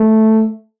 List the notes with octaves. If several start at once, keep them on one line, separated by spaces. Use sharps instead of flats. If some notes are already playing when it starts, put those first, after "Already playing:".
Already playing: A3